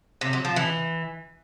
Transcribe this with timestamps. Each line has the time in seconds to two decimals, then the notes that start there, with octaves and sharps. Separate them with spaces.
0.21 C3
0.33 F#3
0.45 F3
0.56 E3